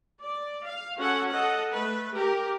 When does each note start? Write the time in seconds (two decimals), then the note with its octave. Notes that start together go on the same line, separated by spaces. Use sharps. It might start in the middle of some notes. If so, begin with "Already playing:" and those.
0.21 D5
0.65 F5
0.97 C#4 F#4 A4 F#5
1.31 A4 D#5 F#5
1.72 A3 B4
2.14 G4 A#4